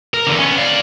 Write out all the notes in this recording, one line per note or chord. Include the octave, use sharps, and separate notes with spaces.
A#4
E2 D3
B3 C#4
D5 F5